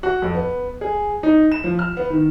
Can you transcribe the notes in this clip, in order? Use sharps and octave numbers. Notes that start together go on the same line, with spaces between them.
F#4
F2
B3
G#4
D#4
E7
F3
F6
B3
D#3